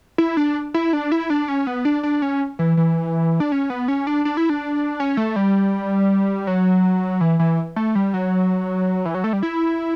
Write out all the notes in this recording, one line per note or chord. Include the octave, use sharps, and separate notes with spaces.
E4
D4
E4
D4
E4
D4
C#4
B3
D4
D4
C#4
E3
E3
D4
C#4
B3
C#4
D4
D4
E4
D4
C#4
A3
G3
F#3
E3
E3
A3
G3
F#3
E3
F#3
A3
G3
E4